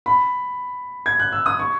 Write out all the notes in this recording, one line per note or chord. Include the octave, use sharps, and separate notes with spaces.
B5
G#6
F#6
E6
D#6
C#6